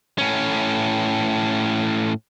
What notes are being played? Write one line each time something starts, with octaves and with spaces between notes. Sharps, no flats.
A2 C#4